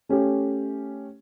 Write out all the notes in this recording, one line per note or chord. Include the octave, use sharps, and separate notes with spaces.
A3 C#4 G4